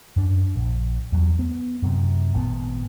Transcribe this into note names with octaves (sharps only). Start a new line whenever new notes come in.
F#2 D4
A#1
E2 F#3
B3
F#2 C3
G#1 A#2 C#3 B3